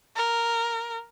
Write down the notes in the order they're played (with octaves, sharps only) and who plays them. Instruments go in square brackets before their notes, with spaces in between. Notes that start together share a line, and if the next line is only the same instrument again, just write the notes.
[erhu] A#4